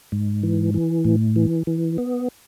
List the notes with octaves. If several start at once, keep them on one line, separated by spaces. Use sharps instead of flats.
G#2
E3
E3
A2
E3
E3
B3